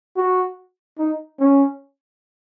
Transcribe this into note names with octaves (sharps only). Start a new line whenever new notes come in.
F#4
D#4
C#4